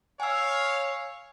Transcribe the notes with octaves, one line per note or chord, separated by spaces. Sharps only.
C#5 F5 G#5 E6